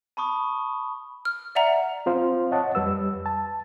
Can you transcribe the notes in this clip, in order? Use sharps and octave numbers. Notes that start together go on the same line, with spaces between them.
A5 B5 C#6 D#6
F6
D5 E5 F#5 A#5
C4 F4 C5 F5
C#5 D#5 F#5 A5
F2 G3 B4 E6
A5